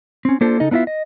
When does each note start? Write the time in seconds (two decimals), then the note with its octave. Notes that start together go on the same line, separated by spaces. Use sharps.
0.25 C4 C#4
0.41 A#3 D4 F4 A4 C5
0.60 C#3 D#4 A4 D#5
0.71 B3 D4 E4 F4 E5
0.87 D#5